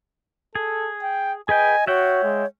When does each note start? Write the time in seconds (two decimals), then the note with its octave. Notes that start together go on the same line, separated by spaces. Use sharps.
0.55 G#4 A4
1.03 G5
1.49 G#4 B4 D#5 G5 G#5
1.87 F#4 C#5 E5 F#5 G5
2.23 G#3